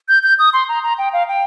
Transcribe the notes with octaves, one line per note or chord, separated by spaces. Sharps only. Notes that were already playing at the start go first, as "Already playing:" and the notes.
G6
G6
D#6
C6
A#5
A#5
G5
F5
G5